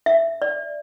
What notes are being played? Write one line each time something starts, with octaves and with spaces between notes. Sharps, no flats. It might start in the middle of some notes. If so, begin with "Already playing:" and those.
E5
D5